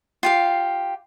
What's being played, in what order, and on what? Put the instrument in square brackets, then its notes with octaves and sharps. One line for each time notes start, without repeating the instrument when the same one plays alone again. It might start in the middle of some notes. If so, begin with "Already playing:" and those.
[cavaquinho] F4 G4 F5